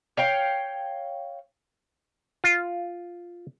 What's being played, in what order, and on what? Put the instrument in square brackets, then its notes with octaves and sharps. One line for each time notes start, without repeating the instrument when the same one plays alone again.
[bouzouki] C#5 F5 G5
[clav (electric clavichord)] F4